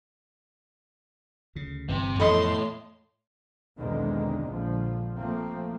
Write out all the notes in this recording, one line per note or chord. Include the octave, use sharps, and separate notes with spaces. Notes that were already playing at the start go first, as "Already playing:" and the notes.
D2 C#3
G1 C3 E3
F2 A2 E3 B3 A4 D#5 C6
B1 E2 D3 D#3 G#3 C4
A#1 A#2 D3 F3
F3 A3 A#3 C4